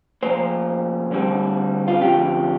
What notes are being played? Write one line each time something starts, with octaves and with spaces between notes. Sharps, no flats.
C3 F3 A#3 C5
D2 D3 G3 C4
F4
D2 C3 F3 D4 G4